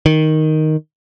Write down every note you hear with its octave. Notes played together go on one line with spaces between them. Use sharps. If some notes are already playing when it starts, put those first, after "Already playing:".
D#3